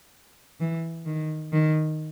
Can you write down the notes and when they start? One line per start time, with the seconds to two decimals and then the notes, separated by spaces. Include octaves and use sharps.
0.60 E3
1.06 D#3
1.53 D#3